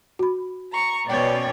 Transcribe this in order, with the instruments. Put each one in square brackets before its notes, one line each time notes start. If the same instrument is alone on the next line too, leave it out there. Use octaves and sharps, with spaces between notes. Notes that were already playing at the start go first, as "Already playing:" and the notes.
[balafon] F#4 B5
[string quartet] A#5 C#6
[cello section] B2 C#4 D5 [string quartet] C#5 G5